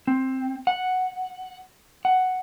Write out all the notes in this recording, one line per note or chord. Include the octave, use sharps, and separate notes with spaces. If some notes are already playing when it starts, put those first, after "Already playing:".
C4
F#5
F#5